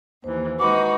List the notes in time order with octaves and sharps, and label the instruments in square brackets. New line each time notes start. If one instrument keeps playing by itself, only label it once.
[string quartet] D#2 E3 [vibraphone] C5
[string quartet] G#3 D#4 F#4 [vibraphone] B4 B5 [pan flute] D6